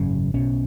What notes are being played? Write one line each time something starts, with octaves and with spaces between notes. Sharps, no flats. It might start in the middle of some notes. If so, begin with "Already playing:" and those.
Already playing: G#1 F#2 C#3
B1 B2 C#4